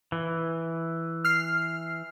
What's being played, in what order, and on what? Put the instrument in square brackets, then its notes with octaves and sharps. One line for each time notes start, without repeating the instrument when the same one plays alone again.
[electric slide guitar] E3
[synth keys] F6 C7